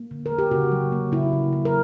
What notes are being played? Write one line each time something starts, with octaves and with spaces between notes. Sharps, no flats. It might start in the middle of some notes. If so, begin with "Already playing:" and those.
Already playing: A#3
D3
A#4
A#3
G4
C#3 F#4
F#3
A#3
C#3 E4
C#3
F#3
A#4